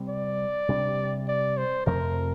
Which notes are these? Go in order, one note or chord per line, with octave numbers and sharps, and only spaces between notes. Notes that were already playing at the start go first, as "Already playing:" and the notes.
Already playing: C3 G3 C4
D5
C3 G3 D4
D5
C5
F2 C3 F3 A3 A#4